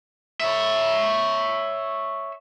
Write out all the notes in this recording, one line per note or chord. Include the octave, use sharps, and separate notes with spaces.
C#5 E5